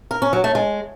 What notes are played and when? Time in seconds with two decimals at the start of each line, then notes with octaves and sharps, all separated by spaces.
0.11 A#4
0.22 C#4
0.33 F#3
0.44 A3
0.55 G#3